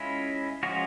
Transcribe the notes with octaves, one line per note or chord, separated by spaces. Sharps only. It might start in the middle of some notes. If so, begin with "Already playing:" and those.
Already playing: G#3 C#4 E4 F4
F3 G#3 C#4 F4 F#4